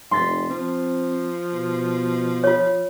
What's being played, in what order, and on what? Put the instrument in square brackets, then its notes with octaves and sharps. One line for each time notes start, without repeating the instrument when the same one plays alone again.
[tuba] F1 [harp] C6 A6 B6
[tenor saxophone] F3 [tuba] C4
[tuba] B2
[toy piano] F4 C#5